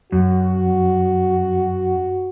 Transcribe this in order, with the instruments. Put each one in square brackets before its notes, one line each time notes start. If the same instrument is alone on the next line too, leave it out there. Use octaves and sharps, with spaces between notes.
[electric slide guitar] F#2 [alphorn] F#4